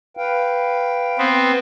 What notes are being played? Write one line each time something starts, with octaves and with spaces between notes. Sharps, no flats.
B4 F5 G5
B3 C4